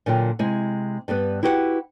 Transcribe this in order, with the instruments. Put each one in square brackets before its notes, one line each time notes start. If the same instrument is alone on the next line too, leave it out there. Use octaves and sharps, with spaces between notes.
[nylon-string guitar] A#2 D3 F#3 F4 G5
C3 G#3 E4
G2 G3 B3 B4
E4 F#4 G4 B4 C#5 F#5